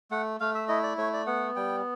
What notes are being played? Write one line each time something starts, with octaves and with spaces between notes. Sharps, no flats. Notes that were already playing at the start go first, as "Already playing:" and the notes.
A3 F#5
A3 F5
E5
E4 D#5
D5
A3 C#5
D5
B3 F#5
G3 G5